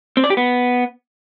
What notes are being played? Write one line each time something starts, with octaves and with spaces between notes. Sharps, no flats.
C4
D5
G4
B3